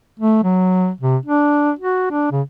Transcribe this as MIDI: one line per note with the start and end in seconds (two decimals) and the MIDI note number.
0.19 0.39 57
0.43 0.90 54
1.00 1.17 48
1.26 1.72 62
1.79 2.06 66
2.11 2.27 62
2.31 2.42 49